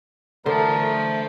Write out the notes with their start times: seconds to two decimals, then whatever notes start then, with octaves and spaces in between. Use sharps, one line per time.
0.46 D3 A3 A#4 C5 A5